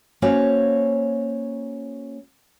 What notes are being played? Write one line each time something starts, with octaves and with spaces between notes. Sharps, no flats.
A#3 C#4 F#4 C5 C#5 F5